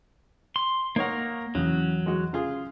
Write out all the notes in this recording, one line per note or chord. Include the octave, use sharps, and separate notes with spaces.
C6
A#3 D#4 A#4 C#5 F#5
E2 C#3 E3 F#3
G#3 F#4
C#3 F4 G#4